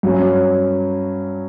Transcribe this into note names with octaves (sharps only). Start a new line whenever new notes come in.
G2 F#3 C#4